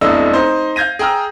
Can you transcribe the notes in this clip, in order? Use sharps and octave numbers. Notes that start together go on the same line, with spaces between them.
F1 B1 D4 E4 D#5 E6
D#4 C5
F5 G6 G#6 A#6 D#7
G#4 G5 A#5 E6 F6